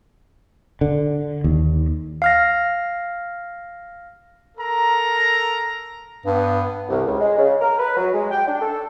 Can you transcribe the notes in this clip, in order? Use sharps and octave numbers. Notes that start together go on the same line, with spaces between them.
D3
D#2
F5 F6 A#6
A4 A#4 A#5
G2 B3
C2
C#2
G#3
C#3
A#4
B4
F#3
G#3
G5
D4
A4